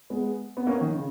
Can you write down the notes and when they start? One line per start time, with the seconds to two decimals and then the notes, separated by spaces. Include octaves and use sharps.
0.10 G#3 B3
0.57 B3
0.67 A#3 C#4
0.81 D#3
0.95 C#3